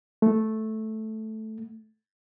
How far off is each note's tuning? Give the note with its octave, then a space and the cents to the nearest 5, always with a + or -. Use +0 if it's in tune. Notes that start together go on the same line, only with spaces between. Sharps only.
A3 -5